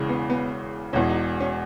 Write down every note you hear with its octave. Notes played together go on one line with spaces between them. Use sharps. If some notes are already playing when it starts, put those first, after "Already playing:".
Already playing: E1 E2 C#3 E3
B3
B3
E1 E2 B2 C#4
D#4
C#4